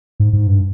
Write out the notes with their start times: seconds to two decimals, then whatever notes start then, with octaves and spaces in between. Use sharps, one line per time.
0.20 G#2
0.33 G#2
0.47 G2